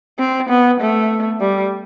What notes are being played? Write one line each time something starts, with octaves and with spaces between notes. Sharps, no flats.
C4
B3
A3
G3